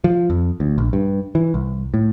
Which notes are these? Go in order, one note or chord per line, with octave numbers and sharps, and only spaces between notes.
F3
F2
D2
A#1
G2
E3
C2
A2